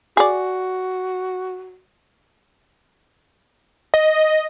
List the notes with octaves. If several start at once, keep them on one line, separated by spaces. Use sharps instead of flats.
F#4 G#4 D5
D#5